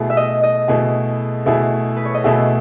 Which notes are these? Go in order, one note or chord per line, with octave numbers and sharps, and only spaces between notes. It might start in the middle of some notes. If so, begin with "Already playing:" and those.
Already playing: B2 A3 E4 G#4
E5
D#5
D#5
B2 A3 E4 G#4
B2 A3 E4 G#4
B4
C#5
D#5
B2 A3 E4 G#4 E5